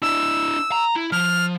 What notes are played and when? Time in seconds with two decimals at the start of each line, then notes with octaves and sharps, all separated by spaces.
0.02 D4 E4 E6
0.72 A#5
0.96 E4
1.12 F3 F6